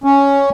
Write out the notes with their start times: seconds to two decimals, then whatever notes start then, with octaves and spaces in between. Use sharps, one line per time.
0.04 C#4